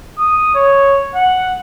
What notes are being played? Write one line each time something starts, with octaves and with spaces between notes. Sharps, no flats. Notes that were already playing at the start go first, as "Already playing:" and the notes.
D#6
C#5
F#5